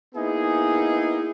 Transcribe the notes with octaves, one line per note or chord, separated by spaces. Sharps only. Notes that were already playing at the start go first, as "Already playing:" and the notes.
A#3 B3 D#4 E4 G#4